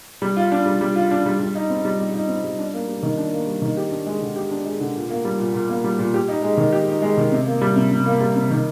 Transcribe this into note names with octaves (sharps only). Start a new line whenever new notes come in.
G3
F4
D4
G3
G3
F4
D4
G3
G3
D#4
C4
G3
G3
D#4
C4
G3
D4
A#3
G3
D#3
D4
A#3
G3
D#3
G4
D4
G#3
D3
G4
D4
G#3
D3
A#2
A#3
G3
A#2
A#2
A#3
G3
A#2
G4
D#4
G#3
D#3
G4
D#4
G#3
D#3
C3
A#3
G3
C3
C3
A#3
G3
C3
D#3